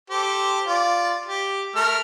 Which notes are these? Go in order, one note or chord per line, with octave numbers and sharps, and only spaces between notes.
G4 A4 C5
F4 D5
G4
A3 A#4 F6